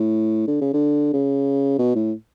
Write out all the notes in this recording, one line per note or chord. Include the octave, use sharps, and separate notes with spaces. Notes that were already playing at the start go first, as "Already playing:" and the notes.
Already playing: A2
D3
C#3
D3
C#3
B2
A2